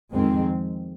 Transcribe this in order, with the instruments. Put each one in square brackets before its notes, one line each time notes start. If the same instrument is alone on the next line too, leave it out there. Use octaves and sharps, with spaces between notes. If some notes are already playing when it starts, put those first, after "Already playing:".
[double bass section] F2 D#3 G#3 C4